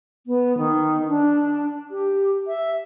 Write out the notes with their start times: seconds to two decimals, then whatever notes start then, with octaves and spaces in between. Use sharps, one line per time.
0.27 B3
0.58 D#3
1.08 D4
1.91 G4
2.47 E5